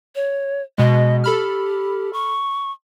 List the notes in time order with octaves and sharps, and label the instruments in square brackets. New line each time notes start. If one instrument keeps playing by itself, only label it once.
[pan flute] C#5
[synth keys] B2 G#3 [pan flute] D#5
[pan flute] G4 [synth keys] A4 B5 F6
[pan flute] C#6